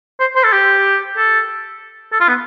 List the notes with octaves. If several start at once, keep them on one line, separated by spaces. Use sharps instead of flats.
C5
C5
A4
G4
A4
A4
F4
B3